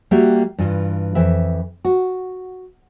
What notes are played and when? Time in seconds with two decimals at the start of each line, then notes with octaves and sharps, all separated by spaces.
0.11 G3 A#3 F#4 G4 E5
0.58 G2 E3 F4
1.15 F2 E3 E5
1.85 F#4